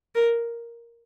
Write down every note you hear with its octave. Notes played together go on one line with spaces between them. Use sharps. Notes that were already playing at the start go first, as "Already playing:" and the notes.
A#4